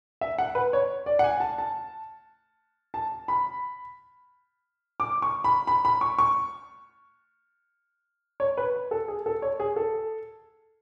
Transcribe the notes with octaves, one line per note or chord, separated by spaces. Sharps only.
E5
F#5
B4
C#5
D5
F#5
G#5
A5
A5
A5
B5
D6
C#6
B5
B5
B5
C#6
C#6
C#5
B4
A4
G#4
A4
C#5
G#4
A4